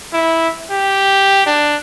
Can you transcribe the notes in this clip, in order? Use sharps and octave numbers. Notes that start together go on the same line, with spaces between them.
E4
G4
D4